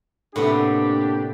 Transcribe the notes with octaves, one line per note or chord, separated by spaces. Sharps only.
A2 C3 A#3 B3 D4 G4